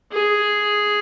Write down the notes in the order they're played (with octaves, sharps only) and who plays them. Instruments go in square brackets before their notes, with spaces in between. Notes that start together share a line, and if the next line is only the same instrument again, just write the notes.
[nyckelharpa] G#4